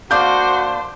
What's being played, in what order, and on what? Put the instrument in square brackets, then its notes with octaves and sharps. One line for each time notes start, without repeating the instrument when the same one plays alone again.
[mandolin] A#3 D4 [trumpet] F#4 [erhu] C5 [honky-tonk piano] D6 G6